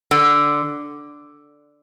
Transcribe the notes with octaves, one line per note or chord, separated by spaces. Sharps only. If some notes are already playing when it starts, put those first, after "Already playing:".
D3